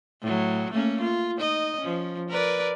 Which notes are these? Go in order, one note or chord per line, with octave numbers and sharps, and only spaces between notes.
A2 F#3
A3 A#3 C#4
F4
D#4 D#5
F3 C#4
A#4 B4 D5